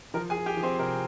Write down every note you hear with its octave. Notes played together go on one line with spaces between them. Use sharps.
F3 A#4
G#4 G#5
F3
G4 G5
F3
C4 C5
C3 A#4